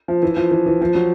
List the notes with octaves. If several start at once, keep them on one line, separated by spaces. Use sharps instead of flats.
F3
E3
F3
E3
E3
F3
F#3